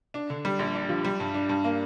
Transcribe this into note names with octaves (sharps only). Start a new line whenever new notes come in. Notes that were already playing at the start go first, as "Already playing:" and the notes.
D4
D3
G3
A#1
D4
F3
G3
G2
D4
G2
A#3